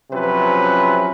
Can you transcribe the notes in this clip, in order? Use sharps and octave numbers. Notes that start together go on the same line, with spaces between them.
C3 F3 F#3 C#4 B4